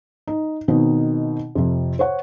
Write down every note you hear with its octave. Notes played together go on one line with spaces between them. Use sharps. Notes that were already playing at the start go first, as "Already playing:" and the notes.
D#4
B2 D#3 C4 D#4
F2 C3
C5 C#5 F#5